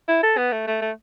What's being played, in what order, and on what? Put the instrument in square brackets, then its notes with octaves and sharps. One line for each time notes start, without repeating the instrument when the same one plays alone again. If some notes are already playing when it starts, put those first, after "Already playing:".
[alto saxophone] E4
A4
B3
A3
A3
A3